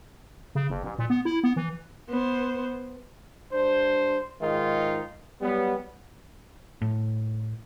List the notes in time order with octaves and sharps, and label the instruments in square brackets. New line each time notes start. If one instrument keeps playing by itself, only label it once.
[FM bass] C#3
F#1
A1
A#2
B3
E4
B3
E3
[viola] B3 C5
[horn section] G2 D4 C5
G#2 D#3 G#3 D#4 F4
F#3 G3 B3
[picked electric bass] A2